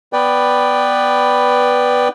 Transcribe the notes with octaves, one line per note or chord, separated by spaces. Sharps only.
B3 B4 D5 G5